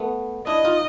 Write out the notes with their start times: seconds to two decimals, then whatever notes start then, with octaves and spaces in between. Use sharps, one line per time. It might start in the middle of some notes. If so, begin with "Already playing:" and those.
Already playing: A3 B3
0.47 D4 E4 D#5
0.65 D#4 F4